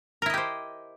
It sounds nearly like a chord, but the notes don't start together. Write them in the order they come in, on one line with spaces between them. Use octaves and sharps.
A#4 E4 D#5 G4 C5